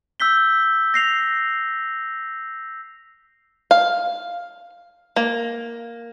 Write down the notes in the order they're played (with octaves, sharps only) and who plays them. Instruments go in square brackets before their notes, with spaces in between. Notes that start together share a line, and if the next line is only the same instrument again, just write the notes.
[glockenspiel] E6 G6 B6 G7
A#6 C7 F7
[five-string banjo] F5
A#3